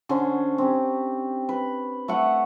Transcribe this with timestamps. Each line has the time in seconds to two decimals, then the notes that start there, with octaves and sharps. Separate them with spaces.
0.09 D3 C#4 C5
0.58 C4 G4
1.49 B4
2.08 A3 E5 F#5 C#6